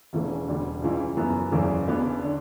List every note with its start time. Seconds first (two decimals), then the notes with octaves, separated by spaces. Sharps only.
0.13 E1 E2 C#3 E3 A3
0.48 E1 D2 D3 G3
0.82 C#2 C#3 E3 G3
1.17 F#2 E3 B3 E4
1.52 F#1 E2 C#3 E3
1.87 D2 C#3 E3 B3 D4
2.24 D3